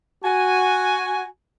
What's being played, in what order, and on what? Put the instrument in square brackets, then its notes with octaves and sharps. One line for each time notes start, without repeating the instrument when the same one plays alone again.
[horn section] F#4 G#5